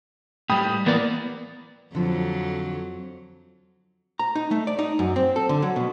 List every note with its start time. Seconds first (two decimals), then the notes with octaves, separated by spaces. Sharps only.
0.50 A2 G3 G5 B5 D#6
0.86 E3 A#3 B3 D5
1.95 F2 D3 F3 F#3
4.19 A#5
4.36 D#4
4.51 A3
4.67 D5
4.79 D#4
4.99 F#2
5.16 C4
5.36 A4
5.49 D3
5.62 F#3
5.76 B2